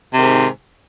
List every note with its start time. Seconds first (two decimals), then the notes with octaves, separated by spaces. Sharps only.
0.11 C3
0.15 D#3
0.20 G#2